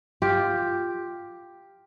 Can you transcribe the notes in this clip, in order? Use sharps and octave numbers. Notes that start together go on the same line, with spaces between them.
F4 G4